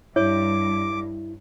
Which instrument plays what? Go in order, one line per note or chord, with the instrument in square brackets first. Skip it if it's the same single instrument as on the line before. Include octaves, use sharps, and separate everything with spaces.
[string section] G2 [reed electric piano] E4 [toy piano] C#5 [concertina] D6